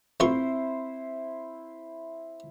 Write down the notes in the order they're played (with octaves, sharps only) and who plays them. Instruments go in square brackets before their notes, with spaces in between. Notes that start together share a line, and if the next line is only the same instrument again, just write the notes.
[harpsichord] A1 F4 C#6 [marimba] C4 [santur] E4 C5